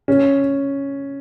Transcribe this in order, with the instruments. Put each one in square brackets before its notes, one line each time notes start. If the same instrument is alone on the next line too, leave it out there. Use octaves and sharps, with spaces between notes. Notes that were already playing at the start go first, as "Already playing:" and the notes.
[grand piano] C#4